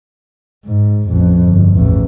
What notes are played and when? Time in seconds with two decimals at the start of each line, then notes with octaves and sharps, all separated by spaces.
0.65 G#2
1.09 A1 F2
1.43 G1
1.75 A1 E2